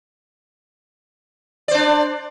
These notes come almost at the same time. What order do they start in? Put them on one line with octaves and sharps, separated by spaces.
D5 C5 D4